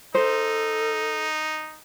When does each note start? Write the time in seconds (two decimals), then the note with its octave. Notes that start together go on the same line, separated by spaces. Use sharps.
0.15 D#4 A4 C5